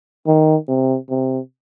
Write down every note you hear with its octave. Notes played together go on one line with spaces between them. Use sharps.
D#3
C3
C3